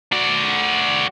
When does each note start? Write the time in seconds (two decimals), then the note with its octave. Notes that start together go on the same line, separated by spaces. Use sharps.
0.12 F#4 D5